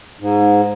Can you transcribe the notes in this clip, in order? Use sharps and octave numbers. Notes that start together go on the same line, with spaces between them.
G#2